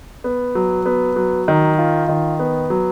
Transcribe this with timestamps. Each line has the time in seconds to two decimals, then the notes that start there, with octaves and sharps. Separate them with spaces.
0.24 B3
0.55 F#3
0.86 B3
1.16 F#3
1.48 D#3
1.79 F4
2.09 D#3
2.39 B3
2.70 F#3